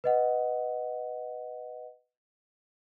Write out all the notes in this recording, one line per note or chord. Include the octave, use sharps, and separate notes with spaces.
B4 D#5 F#5